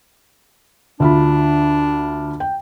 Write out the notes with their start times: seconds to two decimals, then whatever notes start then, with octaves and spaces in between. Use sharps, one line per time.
1.00 D2 D4 F4 B5
2.40 G5